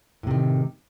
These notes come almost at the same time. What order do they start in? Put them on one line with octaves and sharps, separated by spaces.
A2 C3 D#3